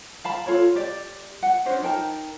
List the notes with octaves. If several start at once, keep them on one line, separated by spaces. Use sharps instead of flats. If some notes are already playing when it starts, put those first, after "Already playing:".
F5 A5 B5
F4 A4 C#5 B5
G4 D5
F#5
C#4 D4 C5 D#5
D#4 A#4 G5 A5